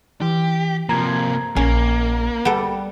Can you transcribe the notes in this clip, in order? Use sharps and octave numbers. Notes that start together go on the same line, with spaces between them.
E3 G4
C3 F3 A#3 A#5 G#6
A#1 A#3 C#4
G3 B3 A4